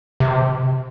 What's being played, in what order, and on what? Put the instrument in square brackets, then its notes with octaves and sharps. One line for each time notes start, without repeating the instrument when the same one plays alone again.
[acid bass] C3